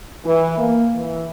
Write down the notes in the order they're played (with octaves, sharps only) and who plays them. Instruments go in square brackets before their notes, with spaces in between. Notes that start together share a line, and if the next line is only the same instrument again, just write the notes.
[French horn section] E3
A#3
E3